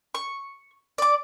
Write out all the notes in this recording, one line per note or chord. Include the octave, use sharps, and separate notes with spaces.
C#6
D5 D6